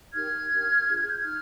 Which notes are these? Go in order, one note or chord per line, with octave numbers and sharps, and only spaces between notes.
D#4 G4 A#4 F6 G#6
D4 G4 A#4
D4 F4 G#4
G#6
G6
F6 G#6
D#4